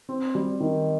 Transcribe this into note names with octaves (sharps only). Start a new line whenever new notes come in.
C4
G3
D#3